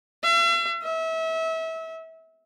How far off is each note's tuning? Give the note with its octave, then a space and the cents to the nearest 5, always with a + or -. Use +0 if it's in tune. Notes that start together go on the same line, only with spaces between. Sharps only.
E5 +45
E5 -30